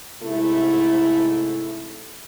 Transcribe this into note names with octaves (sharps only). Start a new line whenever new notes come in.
G#2 C3 A3 E4